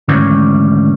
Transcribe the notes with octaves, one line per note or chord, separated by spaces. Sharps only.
D2 G#2 D#3 E3 G3 C#4